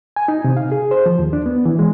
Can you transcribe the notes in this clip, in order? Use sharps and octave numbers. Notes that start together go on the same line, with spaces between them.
G#5
D#4
C3
F5
G#4
C5
F3
D#2
D4
B3
E3
G#3